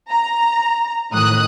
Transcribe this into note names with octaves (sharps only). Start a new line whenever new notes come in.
A#5
A1 A2 D#3 D#6 F#6